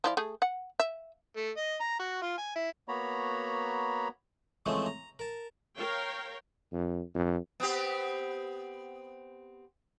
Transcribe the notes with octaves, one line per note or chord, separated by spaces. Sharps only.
F3 E4 D5
A3 G#4
F#5
E5
A3
D#5
A#5
F#4
F4
G#5
E4
A#3 B3 F#4 C#5 A#5 B5
E3 F3 G#3 A3 C4 C#4
A#5
A#4 A5
A#4 C#5 F5 G5
F2
F2
B3 C4 G4